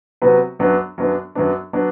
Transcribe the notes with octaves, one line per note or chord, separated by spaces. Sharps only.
C3 F#3 B3 F#4 B4
F#2 F#3 B3 D4
F#2 F#3 B3 D4
F#2 F#3 B3 D4
F#3 B3 D4